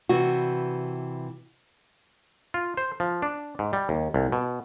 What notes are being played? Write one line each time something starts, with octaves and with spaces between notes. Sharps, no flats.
C3 E3 G3 F#4
F4
C5
F3
D4
G#2
G3
D#2
C2
B2